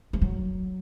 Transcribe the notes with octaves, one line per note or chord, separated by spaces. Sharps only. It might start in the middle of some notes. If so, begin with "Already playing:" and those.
A3
F#3